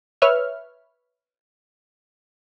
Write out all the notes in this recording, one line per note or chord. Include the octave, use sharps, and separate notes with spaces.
B4 C#5 E5 C#6 F6